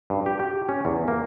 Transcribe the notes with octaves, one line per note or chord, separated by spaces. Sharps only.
G2
G4
G4
C#4
E2
A#3